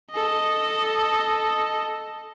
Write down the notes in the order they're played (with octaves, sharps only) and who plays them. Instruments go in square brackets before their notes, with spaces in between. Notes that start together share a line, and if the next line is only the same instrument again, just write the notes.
[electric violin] A4 D#5